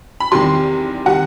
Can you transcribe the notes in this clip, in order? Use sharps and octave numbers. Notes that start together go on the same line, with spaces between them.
B5
E2 C3 D#3 G3 C6
C3 D#3 G3 F#5